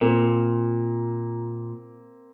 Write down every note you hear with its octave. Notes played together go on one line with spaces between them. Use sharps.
A#2 A#3 C4